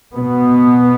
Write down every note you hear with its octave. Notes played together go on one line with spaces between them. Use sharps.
B2 B3